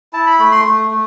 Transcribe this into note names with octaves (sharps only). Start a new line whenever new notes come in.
E4 A5
B5
A3 B5
C6
A3
A3